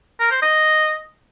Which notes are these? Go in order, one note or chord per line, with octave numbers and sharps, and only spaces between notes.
A#4
C5
D#5